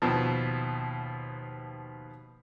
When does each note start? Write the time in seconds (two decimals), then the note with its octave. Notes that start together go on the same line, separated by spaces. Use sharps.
0.02 D#2 B2 F3